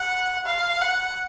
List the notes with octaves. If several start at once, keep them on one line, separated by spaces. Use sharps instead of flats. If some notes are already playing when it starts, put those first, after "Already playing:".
Already playing: F#5
F5
F#5